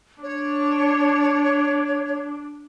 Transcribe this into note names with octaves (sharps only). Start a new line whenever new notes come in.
D4 C#5